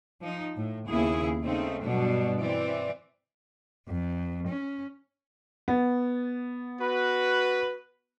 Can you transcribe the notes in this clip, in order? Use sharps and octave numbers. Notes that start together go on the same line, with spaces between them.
F3 D#4
A2
D#2 C#3 B3 E4 G#4
C#3 A3 C4 D#4
G2 B2 F#3 G3 D4
E3 C4 D5
F2
C#4
B3
F#4 B4